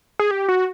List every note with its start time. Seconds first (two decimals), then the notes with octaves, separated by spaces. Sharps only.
0.19 G#4
0.31 G4
0.49 F#4